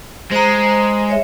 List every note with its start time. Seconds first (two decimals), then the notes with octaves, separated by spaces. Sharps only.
0.31 G#3 C5 A#5
1.10 C#5 E5